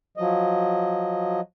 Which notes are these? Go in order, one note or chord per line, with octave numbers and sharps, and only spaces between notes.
F3 F#3 D#5